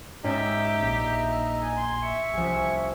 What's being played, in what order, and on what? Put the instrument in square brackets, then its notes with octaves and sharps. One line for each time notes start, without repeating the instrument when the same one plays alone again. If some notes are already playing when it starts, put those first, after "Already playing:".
[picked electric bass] G#2 C#4 [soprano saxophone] D#4 [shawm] G4 [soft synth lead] E5
[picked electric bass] A#1
[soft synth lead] G#5
[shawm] C6
[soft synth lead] E5 [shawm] C#6
[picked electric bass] C2 F3 [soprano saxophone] G#5